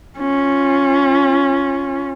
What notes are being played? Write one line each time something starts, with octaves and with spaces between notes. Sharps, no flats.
C#4 F4